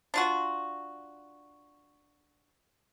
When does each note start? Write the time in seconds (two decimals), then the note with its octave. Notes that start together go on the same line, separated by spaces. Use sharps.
0.14 D4 F4 F#4